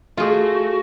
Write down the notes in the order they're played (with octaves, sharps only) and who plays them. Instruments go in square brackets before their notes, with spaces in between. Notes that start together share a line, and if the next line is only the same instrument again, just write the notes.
[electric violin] A3 [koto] F4 G#4 [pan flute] F#4